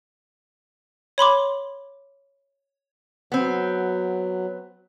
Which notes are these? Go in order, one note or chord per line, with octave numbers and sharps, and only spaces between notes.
C#5 B5 C6 D6
F#3 B3 C4